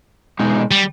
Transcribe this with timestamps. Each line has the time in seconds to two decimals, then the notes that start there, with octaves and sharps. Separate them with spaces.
0.39 B2 G#3 D#4
0.71 G3